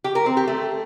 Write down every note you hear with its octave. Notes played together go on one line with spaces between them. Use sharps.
G4
A#4
C4
G4
A3